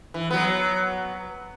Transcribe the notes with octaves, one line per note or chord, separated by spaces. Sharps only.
E3
F#3 B3